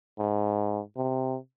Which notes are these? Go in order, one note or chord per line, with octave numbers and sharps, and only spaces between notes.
G#2
C3